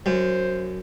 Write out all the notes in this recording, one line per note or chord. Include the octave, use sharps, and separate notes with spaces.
F#2 C5